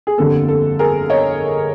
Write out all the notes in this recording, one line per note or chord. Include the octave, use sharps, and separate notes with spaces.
G#4
G1 F2 D3 G3 A#3 A4
A4
G#4 A#4
C#5 D#5